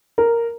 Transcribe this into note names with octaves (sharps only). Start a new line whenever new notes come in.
A#4